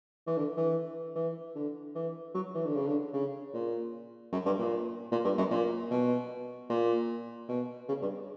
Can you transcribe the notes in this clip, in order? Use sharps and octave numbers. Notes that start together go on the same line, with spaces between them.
E3
D3
E3
E3
D3
E3
F#3
E3
D3
C#3
D3
C#3
A#2
F#2
G2
A#2
A#2
G2
F#2
A#2
B2
A#2
B2
C#3
G2